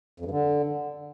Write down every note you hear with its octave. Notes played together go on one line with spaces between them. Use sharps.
F2
G2
D3